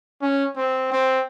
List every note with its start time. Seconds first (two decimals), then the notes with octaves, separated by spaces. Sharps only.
0.22 C#4
0.56 C4
0.92 C4